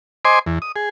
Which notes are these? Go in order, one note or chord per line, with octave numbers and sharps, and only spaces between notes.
C5 D#5 G#5 C6 D6
E2
D#6
G#4